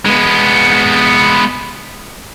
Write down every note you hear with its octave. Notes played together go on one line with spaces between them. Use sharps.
G#3 B3